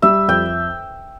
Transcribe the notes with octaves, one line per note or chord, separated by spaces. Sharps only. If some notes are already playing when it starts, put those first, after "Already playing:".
G3 E5
F2 G5